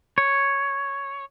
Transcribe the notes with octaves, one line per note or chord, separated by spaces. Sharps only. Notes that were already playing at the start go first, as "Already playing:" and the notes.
C#5